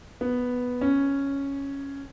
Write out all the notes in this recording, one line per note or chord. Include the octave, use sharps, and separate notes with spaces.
B3
C#4